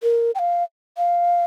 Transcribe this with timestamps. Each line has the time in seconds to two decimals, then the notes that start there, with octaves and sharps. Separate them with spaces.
0.03 A#4
0.35 G5
0.39 F5
0.97 F5